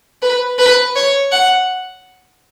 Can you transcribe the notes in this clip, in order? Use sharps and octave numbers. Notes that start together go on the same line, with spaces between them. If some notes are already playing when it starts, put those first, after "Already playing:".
B4
B4
C#5
F#5